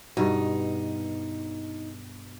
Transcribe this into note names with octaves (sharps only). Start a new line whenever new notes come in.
G2 B2 D#4